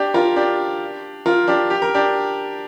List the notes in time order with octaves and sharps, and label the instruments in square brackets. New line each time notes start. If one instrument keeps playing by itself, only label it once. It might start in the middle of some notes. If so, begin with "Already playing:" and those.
Already playing: [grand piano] D4 G4
F4 A#4
D4 G4
F4 A#4
D4 G4
G4
A#4
D4 G4